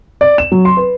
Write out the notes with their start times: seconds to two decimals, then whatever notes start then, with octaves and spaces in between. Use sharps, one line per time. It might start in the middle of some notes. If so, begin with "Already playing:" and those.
0.21 D5
0.38 E7
0.52 F#3
0.65 C6
0.77 B4